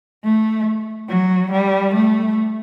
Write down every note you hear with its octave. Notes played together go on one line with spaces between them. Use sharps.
A3
F#3
G3
A3